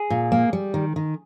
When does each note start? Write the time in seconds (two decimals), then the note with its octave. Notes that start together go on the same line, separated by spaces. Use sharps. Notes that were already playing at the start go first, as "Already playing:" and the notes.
Already playing: G#4
0.10 A#2
0.32 A#3
0.53 G3
0.74 D#3
0.96 D#3